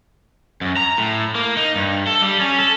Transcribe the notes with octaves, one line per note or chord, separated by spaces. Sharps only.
F#2
A#5
A2
A#3
D#4
G2
A4
G3
C#4
A4